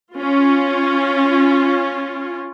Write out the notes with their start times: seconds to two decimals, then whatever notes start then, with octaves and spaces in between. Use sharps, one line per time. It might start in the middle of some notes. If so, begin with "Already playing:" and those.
0.15 C#4 F4